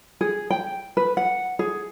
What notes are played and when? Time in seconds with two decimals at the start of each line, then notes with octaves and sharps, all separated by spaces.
0.21 G#4
0.50 G5
0.97 B4
1.17 F#5
1.59 G#4